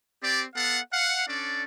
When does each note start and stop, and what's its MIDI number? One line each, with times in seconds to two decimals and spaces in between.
0.22 0.43 60
0.22 0.43 67
0.22 0.43 74
0.55 0.79 59
0.55 0.79 69
0.55 0.79 77
0.55 0.79 78
0.93 1.25 77
0.93 1.25 78
1.27 1.62 61
1.27 1.62 62
1.27 1.62 69
1.27 1.62 74